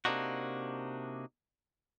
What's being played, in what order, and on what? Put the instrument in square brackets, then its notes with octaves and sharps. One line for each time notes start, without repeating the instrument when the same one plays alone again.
[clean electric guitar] C3 A#3 D4 D#4 F#4